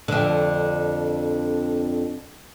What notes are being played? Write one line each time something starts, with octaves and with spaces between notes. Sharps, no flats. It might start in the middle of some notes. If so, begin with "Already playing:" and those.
F2 D3